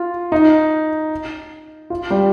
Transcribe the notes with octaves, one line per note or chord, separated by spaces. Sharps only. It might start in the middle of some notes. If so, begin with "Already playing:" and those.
Already playing: F4
D#4
F4
G3